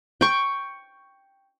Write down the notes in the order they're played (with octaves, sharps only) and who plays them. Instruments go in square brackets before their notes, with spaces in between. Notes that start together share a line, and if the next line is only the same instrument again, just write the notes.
[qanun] G5 C#6